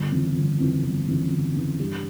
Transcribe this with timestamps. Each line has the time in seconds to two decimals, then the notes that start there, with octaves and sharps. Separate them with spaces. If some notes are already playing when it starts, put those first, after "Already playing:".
Already playing: G1
0.12 F2 C#3 E3
0.36 G1
0.60 F2 C#3 E3
0.84 G1
1.08 F2 C#3 E3
1.31 G1
1.56 F2 C#3 E3
1.80 G2